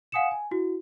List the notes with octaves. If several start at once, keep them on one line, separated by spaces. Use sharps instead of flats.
F5 F#5 G#5 D#6 C#7 E7
G#5
E4 F#4